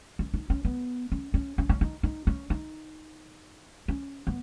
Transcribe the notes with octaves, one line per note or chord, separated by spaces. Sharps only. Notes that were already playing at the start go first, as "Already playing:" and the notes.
C#4
D#4
C#4
B3
C#4
C#4
C#4
C#4
D#4
D#4
C#4
D#4
C#4
B3